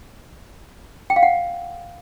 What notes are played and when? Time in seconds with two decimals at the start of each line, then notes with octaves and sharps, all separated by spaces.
1.10 G5
1.16 F5
1.23 F#5